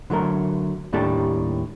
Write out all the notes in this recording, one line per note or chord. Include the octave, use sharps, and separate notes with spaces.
D3 F#3 A3 A#4
D#2 A2 G3 D4 G4 A4